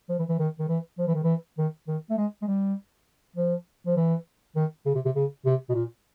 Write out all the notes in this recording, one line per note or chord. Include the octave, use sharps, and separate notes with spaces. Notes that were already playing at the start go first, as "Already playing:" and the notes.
F3
E3
E3
D#3
D#3
E3
F3
E3
D#3
E3
D#3
D#3
A3
G#3
G#3
G3
F3
F3
E3
D#3
C#3
C3
C3
C#3
C3
B2
A#2